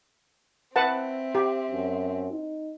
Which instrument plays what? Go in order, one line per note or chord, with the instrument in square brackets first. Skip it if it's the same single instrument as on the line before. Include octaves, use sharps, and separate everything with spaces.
[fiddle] C4 [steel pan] B4 F#5 A5 [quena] E5
[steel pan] G4
[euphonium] F#2
D#4